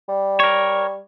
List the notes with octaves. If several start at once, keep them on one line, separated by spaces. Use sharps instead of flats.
G3
A#4 C#5